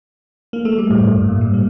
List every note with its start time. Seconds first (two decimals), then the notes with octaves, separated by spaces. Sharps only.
0.53 A#3
0.65 A3
0.78 G3
0.90 A2
1.03 G2
1.16 A2
1.28 A#2
1.41 G3
1.54 A#3